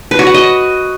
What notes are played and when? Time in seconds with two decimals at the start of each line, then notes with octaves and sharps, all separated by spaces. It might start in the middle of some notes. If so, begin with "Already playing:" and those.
0.11 B4
0.19 F#4
0.27 F#5
0.34 D#5